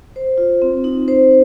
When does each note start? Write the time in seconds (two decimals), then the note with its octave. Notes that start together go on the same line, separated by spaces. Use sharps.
0.16 C5
0.38 F4
0.62 C4
0.84 D#4
1.08 C5